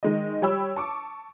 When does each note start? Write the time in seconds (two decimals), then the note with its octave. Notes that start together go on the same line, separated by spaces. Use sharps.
0.03 D#3 G#3 D#5
0.42 G3 C#5 G5 B5 E6
0.76 A5 C#6 D6